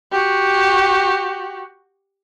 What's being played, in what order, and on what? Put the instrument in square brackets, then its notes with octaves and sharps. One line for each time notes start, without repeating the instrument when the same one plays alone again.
[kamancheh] F#4 G4